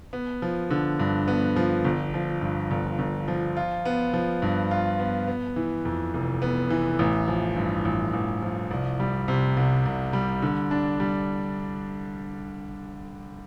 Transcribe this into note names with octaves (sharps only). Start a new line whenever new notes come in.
B3
F3
D3
G2
B3
F3
G1
F3
G2
G1
G1
F3
F4
B3
F3
G2
F4
B3
B3
E3
F2
F1
B3
E3
A1
F3
G2
A1
A1
F3
C2
G3
C3
C2
C2
G3
D3
D4
G3